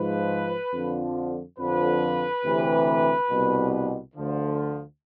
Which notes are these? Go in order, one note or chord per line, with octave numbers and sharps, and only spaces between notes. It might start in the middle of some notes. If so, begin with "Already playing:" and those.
Already playing: G#2 F3 B4
F2 D3 F3
F2 D3 F3 B4
D2 C3 E3
C2 B2
D2 D3 F3